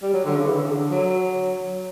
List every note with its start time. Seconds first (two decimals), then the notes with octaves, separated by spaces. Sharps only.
0.03 G3
0.14 F#3
0.25 D3
0.36 C#3
0.47 E3
0.55 D3
0.63 C#3
0.71 D3
0.91 F#3